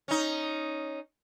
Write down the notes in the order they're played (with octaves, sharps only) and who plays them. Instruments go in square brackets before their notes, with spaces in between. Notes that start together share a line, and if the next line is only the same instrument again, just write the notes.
[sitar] C#4 D#4